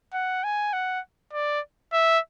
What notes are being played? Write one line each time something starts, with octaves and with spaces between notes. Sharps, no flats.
F#5
G#5
F#5
D5
E5